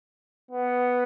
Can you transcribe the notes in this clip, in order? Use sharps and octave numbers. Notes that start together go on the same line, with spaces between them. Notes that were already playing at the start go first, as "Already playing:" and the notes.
B3